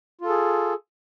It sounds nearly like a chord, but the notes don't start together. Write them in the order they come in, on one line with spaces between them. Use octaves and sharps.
F4 A4 G#4